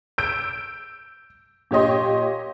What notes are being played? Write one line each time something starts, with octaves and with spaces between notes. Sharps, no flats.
E6 G6 D7
A#2 G4 C#5 D#5 C6